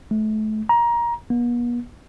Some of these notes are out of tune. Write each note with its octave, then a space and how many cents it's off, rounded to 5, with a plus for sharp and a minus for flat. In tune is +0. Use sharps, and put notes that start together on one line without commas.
A3 -30
A#5 +20
B3 -45